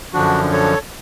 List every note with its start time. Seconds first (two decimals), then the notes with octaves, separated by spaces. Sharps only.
0.14 F#2 D3 F3 D4 F#4
0.52 A4 C#5